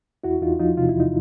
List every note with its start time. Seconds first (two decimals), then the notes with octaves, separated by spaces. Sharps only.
0.24 E2 E4 F#4
0.42 E2 D#4 F4
0.60 F3 D#4 F4
0.77 C3 F4
0.89 E4
0.95 E2 D#4